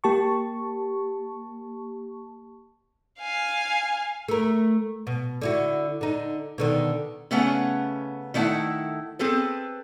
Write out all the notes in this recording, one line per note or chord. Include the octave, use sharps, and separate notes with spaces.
A#3 G4 A5 C#6
F5 G#5
A3 A#4
B2
D3 E4 F#4
D3 D#4
B2 D3 D#3
C#3 A3 B3 C#4 F#5
D#3 A3 D4 E4 E5 F#5
C4 G#4 A4 B4